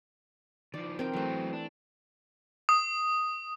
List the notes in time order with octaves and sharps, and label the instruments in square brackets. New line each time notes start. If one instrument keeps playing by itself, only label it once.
[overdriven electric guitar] D#3 F3 [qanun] D5
[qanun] C4 A#4 G5
[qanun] E3 A3 [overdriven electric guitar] F#3 C4
[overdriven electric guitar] D4
[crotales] D#6